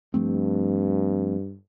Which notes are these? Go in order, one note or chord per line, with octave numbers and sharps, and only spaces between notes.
G2 F3 A3 C4